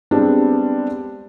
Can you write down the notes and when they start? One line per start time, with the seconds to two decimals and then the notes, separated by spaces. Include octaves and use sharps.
0.11 G3 G#3 B3 C4 D4 G4